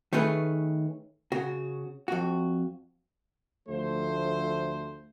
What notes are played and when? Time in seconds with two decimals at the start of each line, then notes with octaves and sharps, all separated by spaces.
0.13 D#3 A3 C#4 G#4 B4
1.32 C#3 F#4
2.08 F2 F#4
3.68 D2 F3 A3 C5